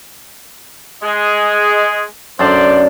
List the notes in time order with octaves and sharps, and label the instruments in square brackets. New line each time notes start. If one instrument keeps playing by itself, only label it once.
[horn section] G#3 G#4
[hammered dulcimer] F#2 D3 A5 [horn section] C5 D5